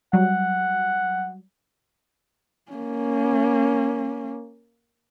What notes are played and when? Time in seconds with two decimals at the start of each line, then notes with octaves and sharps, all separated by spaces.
0.13 F#3 G3 F#5
2.71 A#3 C#4